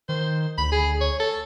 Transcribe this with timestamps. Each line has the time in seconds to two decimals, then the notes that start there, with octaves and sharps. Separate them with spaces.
0.09 D#3 C5
0.58 D2 B5
0.72 G#4
1.01 C#5
1.20 A4